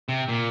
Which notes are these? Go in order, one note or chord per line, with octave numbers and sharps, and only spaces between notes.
C3
A#2